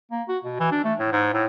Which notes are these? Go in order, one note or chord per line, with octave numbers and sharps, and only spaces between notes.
A#3
F#4
B2
E3
D4
A3
A2
G#2
A2